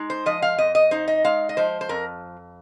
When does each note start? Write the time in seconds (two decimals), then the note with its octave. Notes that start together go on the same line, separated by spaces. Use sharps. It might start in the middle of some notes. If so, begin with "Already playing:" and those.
Already playing: G#3 D#4
0.10 C5
0.26 F3 D#5
0.42 F5
0.58 F2 D#5
0.75 D#5
0.91 D#4 C5
1.08 D#5
1.24 G#3 F5
1.49 D#5
1.57 F3 C5
1.81 C5
1.89 F2 A#4